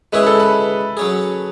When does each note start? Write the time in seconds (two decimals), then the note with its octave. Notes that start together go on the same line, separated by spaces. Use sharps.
0.13 G#3 C#4 E4 G#4 B4
0.26 A4
0.40 B4
0.97 F#3 C#4 G#4